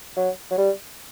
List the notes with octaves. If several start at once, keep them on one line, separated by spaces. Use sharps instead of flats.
F#3
F#3
G3